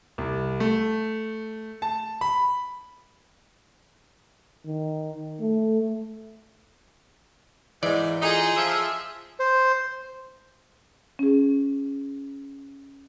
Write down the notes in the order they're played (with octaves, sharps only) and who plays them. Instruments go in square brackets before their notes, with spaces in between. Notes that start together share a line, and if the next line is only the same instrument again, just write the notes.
[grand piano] C2
A3
A5
B5
[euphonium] D#3
A3
[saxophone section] G#2 [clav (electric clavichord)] E3 D5
[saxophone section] D#4 [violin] F4 G#4
[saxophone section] F3 E5
[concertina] C5
[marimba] C#4 G#4